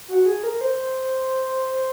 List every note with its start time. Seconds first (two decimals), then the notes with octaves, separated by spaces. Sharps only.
0.08 F#4
0.26 G#4
0.44 A#4
0.61 C5